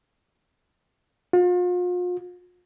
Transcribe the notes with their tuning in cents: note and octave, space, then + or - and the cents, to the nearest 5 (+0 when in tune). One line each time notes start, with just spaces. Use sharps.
F4 +40